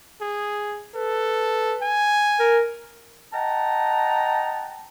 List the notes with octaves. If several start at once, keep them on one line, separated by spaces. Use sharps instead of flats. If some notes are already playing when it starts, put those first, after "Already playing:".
G#4
A4 B4
G#5
A#4
D#5 F#5 G5 A5 A#5